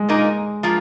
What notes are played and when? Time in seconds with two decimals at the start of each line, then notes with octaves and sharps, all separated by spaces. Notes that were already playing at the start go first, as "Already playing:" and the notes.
Already playing: G#3
0.09 A#2 A#3 D#4 A#4
0.63 F3 A#3 F4